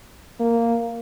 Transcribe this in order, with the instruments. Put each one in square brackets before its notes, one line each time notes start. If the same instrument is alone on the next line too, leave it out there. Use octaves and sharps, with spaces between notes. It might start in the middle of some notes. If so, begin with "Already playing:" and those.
[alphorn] A#3